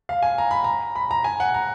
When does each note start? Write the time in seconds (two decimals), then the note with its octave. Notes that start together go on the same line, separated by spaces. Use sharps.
0.09 F5
0.23 G#5
0.38 A#5
0.51 B5
0.64 A#5
0.96 B5
1.11 A#5
1.24 G#5
1.40 F#5
1.54 A#5